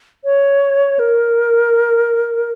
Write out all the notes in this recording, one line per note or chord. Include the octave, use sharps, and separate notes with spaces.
C#5
A#4